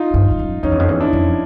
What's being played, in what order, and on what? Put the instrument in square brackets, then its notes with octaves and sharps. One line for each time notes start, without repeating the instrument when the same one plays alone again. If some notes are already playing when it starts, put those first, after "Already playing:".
Already playing: [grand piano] D#4 F4
[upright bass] G2
G2
F#2
[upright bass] F2 [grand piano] C#4 D#4
[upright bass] E2
F2
E2
[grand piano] D4 E4
[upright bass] F2